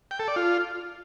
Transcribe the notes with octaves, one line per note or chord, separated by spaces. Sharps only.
G5
A4
D5
F4